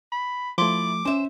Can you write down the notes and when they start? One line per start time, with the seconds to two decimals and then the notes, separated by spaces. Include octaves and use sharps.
0.12 B5
0.58 F3 A3 E4 D5 C6 D6
1.05 C#4 C5 E5